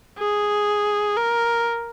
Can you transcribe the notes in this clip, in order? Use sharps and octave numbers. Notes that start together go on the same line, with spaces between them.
G#4
A#4